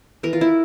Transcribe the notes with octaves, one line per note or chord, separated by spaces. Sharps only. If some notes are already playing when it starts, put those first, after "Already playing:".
E3 A#4
F4
E4